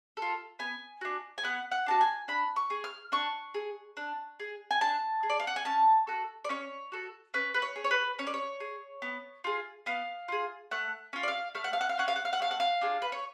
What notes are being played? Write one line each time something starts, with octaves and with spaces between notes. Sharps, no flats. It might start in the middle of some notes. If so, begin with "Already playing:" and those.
A4
F4
B3 G#5
D4 F#4
G#5
B3 F#5
F#5
D4 F#4 A5
G#5
D4 B5
C#6
G#4
F6
D4 C#6
G#4
D4
G#4
G#5
D4 A5
G#4
D5
F5
F#5
G#5
C#4 A5
F#4 A4
D5
C#4 C#5
F#4 A4
C#4 B4
B4
C#5
G#4
C#5
B4
C#4 C#5
D5
C#5
G#4
B3
F4 G#4
B3 F5
F4 G#4
A3 F#5
C#4 F4
D5
F5
A3 F5
F#5
F5
F#5
F5
C#4 F4 F#5
F5
F#5
F5
F#5
A3 F5
F#5
F5
D4 F4 G#4
B4
C#5